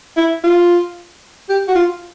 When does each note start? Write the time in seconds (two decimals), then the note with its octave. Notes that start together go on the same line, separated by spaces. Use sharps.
0.17 E4
0.44 F4
1.49 G4
1.68 F#4
1.75 F4